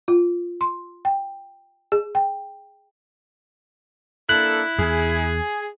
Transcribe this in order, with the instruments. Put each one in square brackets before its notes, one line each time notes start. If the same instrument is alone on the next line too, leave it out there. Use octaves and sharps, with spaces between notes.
[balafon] F4
C6
G5
G#4
G5
[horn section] A#3 D4 A4 [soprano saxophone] E4 [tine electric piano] F#6
[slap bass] E2 [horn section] G#4